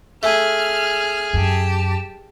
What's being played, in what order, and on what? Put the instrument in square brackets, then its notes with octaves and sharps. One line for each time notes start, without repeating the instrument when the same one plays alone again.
[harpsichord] A3 [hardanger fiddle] G#4 [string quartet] F6
[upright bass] F#2 [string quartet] G4 A5